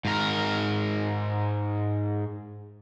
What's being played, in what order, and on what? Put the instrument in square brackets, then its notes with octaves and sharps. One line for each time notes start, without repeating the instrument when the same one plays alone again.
[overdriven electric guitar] G#2 A#4